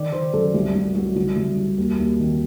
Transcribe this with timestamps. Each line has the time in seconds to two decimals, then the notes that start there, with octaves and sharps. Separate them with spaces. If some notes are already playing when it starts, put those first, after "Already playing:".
Already playing: D#3 D5
0.12 D#3 C5
0.33 F#2 A4
0.54 C2 G4
0.75 C2 F#4
0.95 C2 F#4
1.16 C2 F#4
1.37 C2
1.57 C2
1.78 D#2
1.98 D#2
2.20 D#3